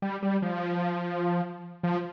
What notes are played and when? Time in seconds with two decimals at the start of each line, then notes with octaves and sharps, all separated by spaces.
0.02 G3
0.23 G3
0.42 F3
1.83 F3